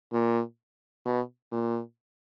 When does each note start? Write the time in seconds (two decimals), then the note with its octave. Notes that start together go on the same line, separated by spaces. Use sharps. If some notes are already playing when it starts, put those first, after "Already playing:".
0.13 A#2
1.06 B2
1.52 A#2